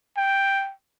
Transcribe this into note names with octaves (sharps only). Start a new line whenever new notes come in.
G5